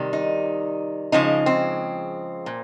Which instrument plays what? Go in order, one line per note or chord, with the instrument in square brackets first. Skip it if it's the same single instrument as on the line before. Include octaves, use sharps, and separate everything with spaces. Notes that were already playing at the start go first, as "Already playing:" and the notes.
Already playing: [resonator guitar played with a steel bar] C3 D#3 G3
D#4
C#3 F3 G#3 D#4
C4
A#2